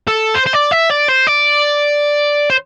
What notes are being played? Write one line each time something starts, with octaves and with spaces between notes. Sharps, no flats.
A4
C5
C5
D5
E5
D5
C5
D5
C5